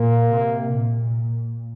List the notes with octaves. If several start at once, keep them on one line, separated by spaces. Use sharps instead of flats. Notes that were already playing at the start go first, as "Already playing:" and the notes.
Already playing: A#2 A#3
C3
A#2